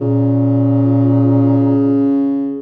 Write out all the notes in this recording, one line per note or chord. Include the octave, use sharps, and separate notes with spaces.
A#2 C#3